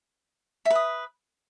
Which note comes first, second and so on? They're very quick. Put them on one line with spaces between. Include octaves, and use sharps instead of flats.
E5 B4 D#6